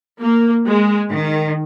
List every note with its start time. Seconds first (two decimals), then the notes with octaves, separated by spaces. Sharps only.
0.21 A#3
0.67 G#3
1.13 D#3